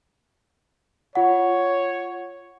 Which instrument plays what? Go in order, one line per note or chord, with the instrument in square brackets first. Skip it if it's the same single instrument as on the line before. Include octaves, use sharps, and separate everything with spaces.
[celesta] F4 F#5 [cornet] C#5